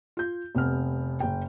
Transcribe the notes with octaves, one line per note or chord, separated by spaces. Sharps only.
F4 G6
F1 C3 B3 F6
F#1 G5